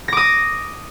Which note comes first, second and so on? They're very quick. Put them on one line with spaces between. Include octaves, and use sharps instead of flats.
A#6 D6 D#6